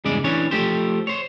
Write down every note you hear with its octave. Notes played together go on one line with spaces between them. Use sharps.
E2 G2 C#3 G#3 D5
E3 C#4 D4 C#5
F3 A3 G4 C5
C5 C#5